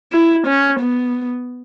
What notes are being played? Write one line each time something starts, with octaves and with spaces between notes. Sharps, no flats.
E4
C#4
B3